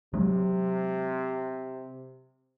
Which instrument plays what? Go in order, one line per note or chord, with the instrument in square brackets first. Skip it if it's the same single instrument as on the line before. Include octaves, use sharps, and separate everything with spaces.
[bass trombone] C3 [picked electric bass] F#3 G#3 C4